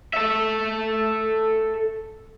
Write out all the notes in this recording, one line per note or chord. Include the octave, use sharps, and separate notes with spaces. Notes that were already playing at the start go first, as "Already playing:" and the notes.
A4 E5